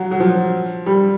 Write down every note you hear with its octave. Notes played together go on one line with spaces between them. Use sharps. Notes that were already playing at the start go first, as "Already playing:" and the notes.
Already playing: F#3
F#3
F3
G3